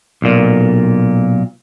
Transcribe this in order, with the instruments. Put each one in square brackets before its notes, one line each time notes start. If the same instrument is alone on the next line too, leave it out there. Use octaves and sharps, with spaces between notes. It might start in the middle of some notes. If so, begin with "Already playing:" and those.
[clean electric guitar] B1 A#2